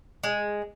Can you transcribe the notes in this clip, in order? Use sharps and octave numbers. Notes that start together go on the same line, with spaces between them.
G#3